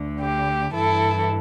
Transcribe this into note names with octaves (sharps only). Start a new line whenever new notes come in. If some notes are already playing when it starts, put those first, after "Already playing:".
Already playing: D2 D3
G4
G2 E3 E4 A4